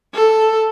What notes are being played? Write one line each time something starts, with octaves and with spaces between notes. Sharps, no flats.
A4